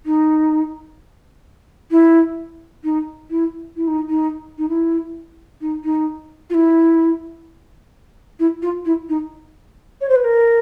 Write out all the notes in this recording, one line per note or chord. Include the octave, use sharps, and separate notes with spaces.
D#4
E4
D#4
E4
E4
D#4
D#4
D#4
E4
D#4
D#4
F4
E4
E4
F4
E4
D#4
C#5
C5
B4
A#4